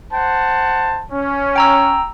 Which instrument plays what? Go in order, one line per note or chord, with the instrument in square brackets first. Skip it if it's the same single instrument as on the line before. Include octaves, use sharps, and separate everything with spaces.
[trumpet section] C5 F#5 A5
C#4
[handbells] G5 A#5 E6